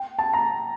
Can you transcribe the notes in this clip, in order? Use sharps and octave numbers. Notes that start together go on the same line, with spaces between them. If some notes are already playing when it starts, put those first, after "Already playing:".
Already playing: G5
A5
A#5